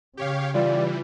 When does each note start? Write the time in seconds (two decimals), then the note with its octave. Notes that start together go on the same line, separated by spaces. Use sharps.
0.17 C#3 G4 C#5 F5
0.54 E3 G3 F4 D5